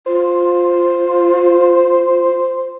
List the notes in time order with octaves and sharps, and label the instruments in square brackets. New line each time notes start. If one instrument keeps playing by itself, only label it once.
[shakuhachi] F4 [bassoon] C5